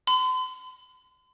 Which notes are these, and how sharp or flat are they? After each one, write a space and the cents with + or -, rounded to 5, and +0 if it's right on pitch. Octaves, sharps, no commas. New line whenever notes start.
C6 -45